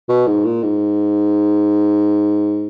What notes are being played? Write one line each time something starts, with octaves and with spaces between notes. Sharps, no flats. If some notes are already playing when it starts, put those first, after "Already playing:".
B2
G#2
A#2
G#2